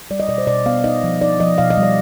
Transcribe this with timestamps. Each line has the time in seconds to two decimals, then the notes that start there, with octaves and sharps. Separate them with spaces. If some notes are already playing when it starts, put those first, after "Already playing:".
0.10 G3 D5
0.20 D#5
0.28 B2 D5
0.38 C5
0.47 B2 D5
0.66 B3 F5
0.84 D#4 D#5
1.03 F3
1.21 D#4 D5
1.40 F3 D#5
1.58 B2 F5
1.70 D#5
1.77 G3
1.83 D5